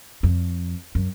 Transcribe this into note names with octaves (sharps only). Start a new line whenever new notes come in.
F2
F#2